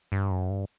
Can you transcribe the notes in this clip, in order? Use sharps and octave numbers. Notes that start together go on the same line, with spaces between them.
G2
F#2
G2